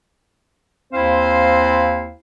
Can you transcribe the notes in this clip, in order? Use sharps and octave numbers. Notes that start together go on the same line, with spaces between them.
D#2 C4 E4 C5 F5